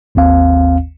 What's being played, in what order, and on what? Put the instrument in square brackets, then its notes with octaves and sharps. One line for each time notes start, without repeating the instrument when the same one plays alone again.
[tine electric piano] G#1 D#2 C4 F5